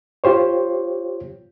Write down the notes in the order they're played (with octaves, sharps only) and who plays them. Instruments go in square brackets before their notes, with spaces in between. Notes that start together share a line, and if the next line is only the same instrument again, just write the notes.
[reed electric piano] F4 G4 C5 C#5